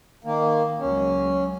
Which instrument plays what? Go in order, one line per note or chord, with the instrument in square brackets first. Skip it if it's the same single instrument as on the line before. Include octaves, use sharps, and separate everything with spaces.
[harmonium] D#3 A#3
[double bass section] C#2 F#3 [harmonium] C#4